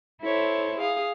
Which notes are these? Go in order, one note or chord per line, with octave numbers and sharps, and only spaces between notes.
E4 A4 C5 C#5
G#4 F5 D#6